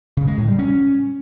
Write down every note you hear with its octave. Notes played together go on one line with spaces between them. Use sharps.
C#3
G#3
A2
G3
C#4